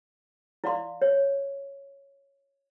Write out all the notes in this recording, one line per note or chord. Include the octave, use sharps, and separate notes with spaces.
E4 D5 F5 C6
C#5